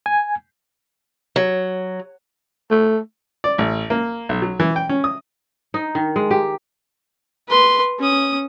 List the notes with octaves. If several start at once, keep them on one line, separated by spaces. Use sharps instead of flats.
G#5
F#3
A3
D5
A1
A#3
B1
F#3
E3
G5
C#4
D#6
D#4
D#3
G#3
G4
B4 C6
C#4 D#6